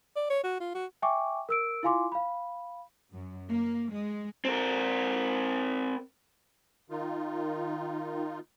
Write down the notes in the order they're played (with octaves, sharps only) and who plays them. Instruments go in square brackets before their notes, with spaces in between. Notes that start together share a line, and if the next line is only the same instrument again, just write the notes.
[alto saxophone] D5
C#5
F#4
F4
F#4
[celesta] E5 G5 G#5 C#6 D6
A#4 E6 D7
E4 F4 F5 G#5 C6 D6
F5 B5
[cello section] F#2
A#3
G#3
[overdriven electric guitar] C4 A#4
[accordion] D#3 D#4 F4